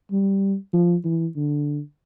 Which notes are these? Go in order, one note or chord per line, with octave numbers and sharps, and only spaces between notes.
G3
F3
E3
D3